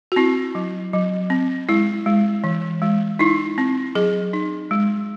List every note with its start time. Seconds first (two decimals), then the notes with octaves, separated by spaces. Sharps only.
0.12 F#4
0.16 C4 E4
0.55 F#3
0.93 F#3
1.30 C4
1.69 G#3 E4
2.06 G#3
2.44 E3
2.82 G#3
3.19 D#4 E4
3.58 C4
3.95 F#3 G#4
4.33 D#4
4.71 G#3